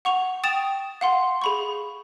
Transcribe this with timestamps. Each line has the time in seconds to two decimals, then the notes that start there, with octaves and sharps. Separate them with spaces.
0.05 F#5 C#6 F7
0.44 G5 D#6 A6 E7 F7
1.01 F5 F#5 C6
1.42 G#4 B5 C#6